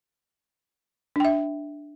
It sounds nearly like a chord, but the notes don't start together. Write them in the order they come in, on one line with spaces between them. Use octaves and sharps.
D4 G5 E5